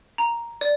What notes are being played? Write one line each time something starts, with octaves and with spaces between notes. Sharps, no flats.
A#5
D5